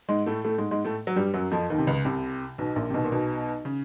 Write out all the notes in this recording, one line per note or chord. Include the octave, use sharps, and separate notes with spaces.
G#2 G#3
A2 A3
A2 A3
G#2 G#3
G#2 G#3
A2 A3
F#3
G2 G3
F#2 F#3
F2 F3
D#2 D#3
C3
C#2 C#3
C2 C3
B1 B2
A#1 A#2
C3
B1 B2
A#2
B1 B2
C#3